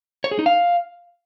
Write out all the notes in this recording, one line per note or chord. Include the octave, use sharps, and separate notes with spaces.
C#5
G#4
D#4
F5